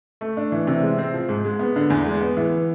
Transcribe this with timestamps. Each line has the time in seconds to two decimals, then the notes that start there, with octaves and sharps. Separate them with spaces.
0.21 A3
0.37 D4
0.52 E3
0.67 C3
0.83 G#3
0.98 C4
1.14 F3
1.29 G#2
1.44 G#3
1.59 B3
1.76 D3
1.90 E2
2.06 G#3
2.21 B3
2.37 E3